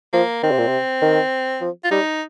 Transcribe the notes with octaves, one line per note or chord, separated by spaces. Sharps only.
F3 A#3
D#3 C4
C3
A#2
C3
D#3
F3
F4
G3 D#4